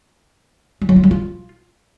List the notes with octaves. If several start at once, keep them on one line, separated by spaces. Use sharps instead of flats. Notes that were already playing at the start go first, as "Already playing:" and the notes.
G3
F#3
F4
G3
F4